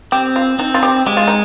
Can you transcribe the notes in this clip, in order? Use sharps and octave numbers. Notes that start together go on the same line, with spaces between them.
C4 G4
F4
C4 D#4
F4
G4
G#3 G4
F4
D#4